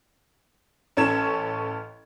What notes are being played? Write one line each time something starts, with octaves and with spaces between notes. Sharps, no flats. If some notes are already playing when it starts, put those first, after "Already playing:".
A1 C#4 A4 G#6 E7